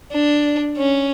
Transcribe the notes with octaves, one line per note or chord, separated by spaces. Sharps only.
D4
C#4